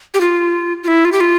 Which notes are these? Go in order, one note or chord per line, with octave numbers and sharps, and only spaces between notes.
G4
F4
F4
E4
F4
G4
F4